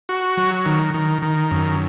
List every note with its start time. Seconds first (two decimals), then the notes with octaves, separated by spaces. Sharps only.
0.09 F#4
0.37 F#3
0.66 D#3
0.94 D#3
1.22 D#3
1.51 F#2